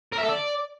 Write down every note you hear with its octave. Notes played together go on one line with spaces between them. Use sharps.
A#4
E5
A4
D5